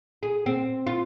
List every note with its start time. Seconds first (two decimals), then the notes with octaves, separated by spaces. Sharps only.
0.23 G#4
0.46 C4
0.87 F4